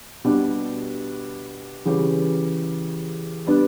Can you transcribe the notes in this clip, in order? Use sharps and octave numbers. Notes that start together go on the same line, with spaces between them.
B2 G3 D4 G4
C#3 E3 G3 C#4 G4
G3 B3 D4